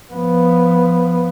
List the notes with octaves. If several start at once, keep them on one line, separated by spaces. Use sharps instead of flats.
F3 B3